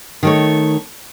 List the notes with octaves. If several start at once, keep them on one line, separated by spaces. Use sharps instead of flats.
D#3 A3 C#5